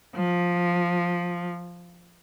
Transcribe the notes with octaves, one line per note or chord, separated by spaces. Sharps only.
F3